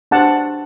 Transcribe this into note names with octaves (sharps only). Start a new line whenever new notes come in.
D4 G4 C5 F#5 A5